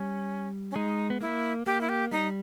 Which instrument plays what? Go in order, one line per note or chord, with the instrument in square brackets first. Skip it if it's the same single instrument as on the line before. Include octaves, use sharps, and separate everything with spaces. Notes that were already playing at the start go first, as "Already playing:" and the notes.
Already playing: [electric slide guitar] G3 [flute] C#4
[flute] C#4
[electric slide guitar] G#3 [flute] D#4
[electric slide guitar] B3
[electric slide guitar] A#3 [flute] E4
[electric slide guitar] A#3 [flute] G4
[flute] E4
G4
[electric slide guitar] G3 [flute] D#4